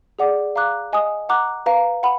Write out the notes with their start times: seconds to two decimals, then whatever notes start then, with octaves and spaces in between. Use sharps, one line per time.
0.19 G#4 D5 F#5 D6
0.56 F5 A#5 D6 F#6
0.93 D#5 G#5 D#6
1.29 F#5 A#5 D6 F#6
1.66 B4 F5 A#5
2.03 F#5 B5